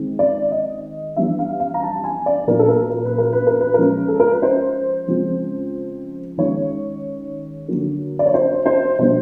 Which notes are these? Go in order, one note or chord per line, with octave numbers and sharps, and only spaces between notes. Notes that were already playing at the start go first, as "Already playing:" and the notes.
Already playing: D#3 G#3 C4
D5
D#5
E3 G3 B3 D4 E5
F5
F5
A#5
A5
G#5
D5
A#2 F#3 B3 D4 A#4
A4
A#4
A#4
B4
A#4
B4
A#4
B4
F3 G#3 C#4 A#4
A4
A#4
B4
C5
C#3 F3 G#3 C4
D#3 G#3 C#4 C#5
D3 F#3 A#3
D5
C#5
C5
C5
B2 G3 B3 D4 C5